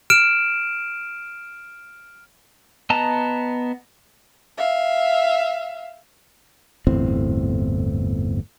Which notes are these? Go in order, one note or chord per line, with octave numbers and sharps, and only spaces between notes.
F6 D7 E7
B3 D#5 A5 A#5
E5 F5
G1 E2 A2 C4